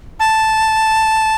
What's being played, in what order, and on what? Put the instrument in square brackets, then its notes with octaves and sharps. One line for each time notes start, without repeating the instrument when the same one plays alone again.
[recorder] A5